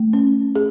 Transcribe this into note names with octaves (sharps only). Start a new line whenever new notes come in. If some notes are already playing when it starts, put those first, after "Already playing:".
Already playing: A3
C#4
G#4